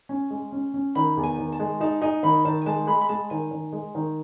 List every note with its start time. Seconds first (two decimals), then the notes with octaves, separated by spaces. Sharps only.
0.09 C#4
0.30 G#3
0.52 C#4
0.74 C#4
0.95 D#3 B5
1.17 E2
1.23 G#5
1.38 D#3
1.52 A5
1.60 G#3
1.81 D#4 A5
2.02 D#4 G#5
2.23 D#3 B5
2.45 D#3 A5
2.62 G#5
2.66 G#3 A5
2.87 G#3 B5
3.01 B5
3.09 G#3 A5
3.30 D#3 G#5
3.51 D#3
3.73 G#3
3.95 D#3